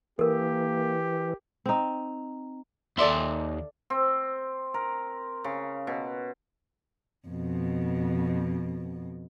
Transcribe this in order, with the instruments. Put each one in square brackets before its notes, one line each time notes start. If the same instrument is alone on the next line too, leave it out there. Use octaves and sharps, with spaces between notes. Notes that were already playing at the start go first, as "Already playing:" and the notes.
[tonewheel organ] E3 [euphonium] A#3 [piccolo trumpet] G4 [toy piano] A4 A#4
[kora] C4 D#4
[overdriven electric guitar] D#2 C6 [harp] A4 D5 E5
[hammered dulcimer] C4
A#4
C#3
B2
[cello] F2 B2